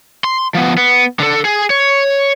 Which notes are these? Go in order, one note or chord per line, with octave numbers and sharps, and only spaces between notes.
C6
F3 B3
B3
D3 A4
G#4
C#5